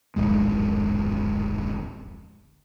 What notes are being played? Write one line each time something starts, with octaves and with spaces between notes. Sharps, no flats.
D1 G#1 F2 G#3